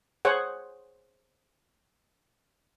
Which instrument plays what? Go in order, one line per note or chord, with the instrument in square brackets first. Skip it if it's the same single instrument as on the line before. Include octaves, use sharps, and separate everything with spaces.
[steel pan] G#4 C5 C#5 F#5